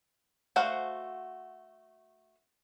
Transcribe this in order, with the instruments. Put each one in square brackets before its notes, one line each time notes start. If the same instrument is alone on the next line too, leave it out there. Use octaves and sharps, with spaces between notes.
[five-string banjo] A3 F#4 C5 F5 F#5